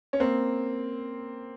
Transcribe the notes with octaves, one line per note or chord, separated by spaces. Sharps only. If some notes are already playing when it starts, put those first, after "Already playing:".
C#4
A#3 C4